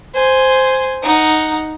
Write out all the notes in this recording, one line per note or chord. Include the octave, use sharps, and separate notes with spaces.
C5 G#5
D#4 F#5